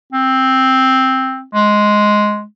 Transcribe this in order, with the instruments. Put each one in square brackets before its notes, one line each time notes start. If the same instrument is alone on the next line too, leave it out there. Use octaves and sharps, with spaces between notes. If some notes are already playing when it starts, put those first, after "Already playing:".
[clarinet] C4
G#3